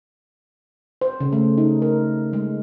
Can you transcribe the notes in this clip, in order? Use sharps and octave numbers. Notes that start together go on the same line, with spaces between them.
C5
C#3
A3
D#4
A#4
G#3